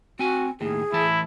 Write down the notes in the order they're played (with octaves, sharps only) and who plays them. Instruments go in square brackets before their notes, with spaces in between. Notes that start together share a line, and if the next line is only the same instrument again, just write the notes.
[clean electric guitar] C4 G#5 [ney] F#4
[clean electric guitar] D#2 A2 [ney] G#4
[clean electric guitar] A2 E3 A5 [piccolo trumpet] E4